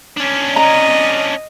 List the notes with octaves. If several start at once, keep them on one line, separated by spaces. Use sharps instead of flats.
C#4 D4
D#5 A#5